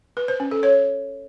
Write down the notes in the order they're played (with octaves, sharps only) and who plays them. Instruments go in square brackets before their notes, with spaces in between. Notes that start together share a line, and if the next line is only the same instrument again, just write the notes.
[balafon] B4
C5
C#4
A4
C#5